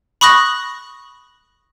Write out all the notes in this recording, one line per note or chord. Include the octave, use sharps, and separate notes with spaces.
B5 C#6 D#6 F#6 A#6